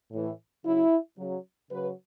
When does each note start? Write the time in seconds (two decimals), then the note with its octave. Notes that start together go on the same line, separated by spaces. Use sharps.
0.12 A2 E3
0.64 C#3 F#3 E4
1.18 C#3 F#3
1.71 C#3 F#3 B4